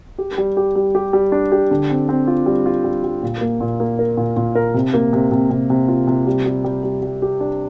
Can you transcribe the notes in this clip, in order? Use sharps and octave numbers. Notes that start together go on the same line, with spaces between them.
G4
G3
G4
G3
G4
G3
D4
G4
D3
C4
C4
F4
G3
F4
G3
G3
A#2
A#3
A#2
A#3
A#4
A#2
A#2
A#4
C3
A#3
C3
C3
C3
C3
F4
C3
G3
G3
G3
G3
G3
G4
D4